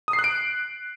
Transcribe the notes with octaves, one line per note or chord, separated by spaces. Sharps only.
D#6
C7
F#6
D7